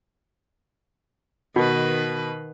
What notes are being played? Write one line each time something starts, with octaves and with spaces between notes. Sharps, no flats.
B2 D#3 B4